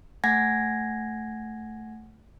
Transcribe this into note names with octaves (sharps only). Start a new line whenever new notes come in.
A3 F#5 G#5 G#6 A#6